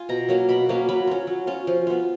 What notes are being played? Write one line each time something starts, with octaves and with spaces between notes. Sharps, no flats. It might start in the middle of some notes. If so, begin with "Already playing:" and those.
Already playing: F4 G#5
B2 A#5
F#3 A#3 C#4
B2 B5
F#3 A#3 C#4
F#3 B5
C#4 F4
F#3
C#4 F4
F3
B3 F4